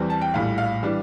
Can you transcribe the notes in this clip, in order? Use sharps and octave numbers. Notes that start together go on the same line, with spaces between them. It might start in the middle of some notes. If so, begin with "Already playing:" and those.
Already playing: E2 E3 G3 C4
A5
G5
A#1 A2 G3 F5
F5
E3 G3 D4